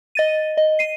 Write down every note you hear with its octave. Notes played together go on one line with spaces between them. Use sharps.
D#5 A6 D#7
D#5
C7 D#7